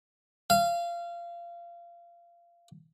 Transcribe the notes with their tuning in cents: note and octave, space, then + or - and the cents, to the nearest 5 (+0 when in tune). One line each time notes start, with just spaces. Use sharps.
F5 -25